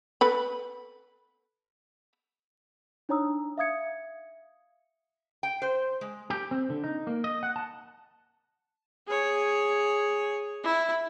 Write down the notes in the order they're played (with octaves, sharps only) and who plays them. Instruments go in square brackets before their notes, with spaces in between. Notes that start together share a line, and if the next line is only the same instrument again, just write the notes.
[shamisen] A4 B4 B5
[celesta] D4 D#4 C#5 A#5 D#6 E6
E5 F5 D#6 G#6 C#7
[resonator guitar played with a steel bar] G5
C5
G#3
[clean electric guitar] G4
C4
D3
D#4
A#3
D#5
F#5
A5
[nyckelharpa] G#4 C#5
E4